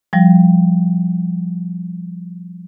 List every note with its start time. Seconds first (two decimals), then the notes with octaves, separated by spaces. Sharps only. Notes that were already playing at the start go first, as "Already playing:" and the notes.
0.13 F3 G3